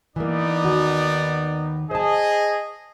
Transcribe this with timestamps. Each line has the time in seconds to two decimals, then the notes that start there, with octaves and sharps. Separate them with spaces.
0.16 E3 A#3 B3 D#4 D5
0.64 D#2 D#3 F#4
1.91 G#4 C5 D#5 A5